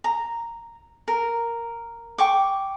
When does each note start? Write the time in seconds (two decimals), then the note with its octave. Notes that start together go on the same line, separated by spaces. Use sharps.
0.04 A#5
1.08 A#4
2.18 G5 C#6 D6